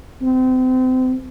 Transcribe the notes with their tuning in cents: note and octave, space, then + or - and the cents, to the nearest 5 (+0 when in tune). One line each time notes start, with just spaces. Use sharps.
C4 -30